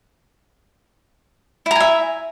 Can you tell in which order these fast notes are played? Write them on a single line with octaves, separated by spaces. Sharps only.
E4 A#5 G#5 E5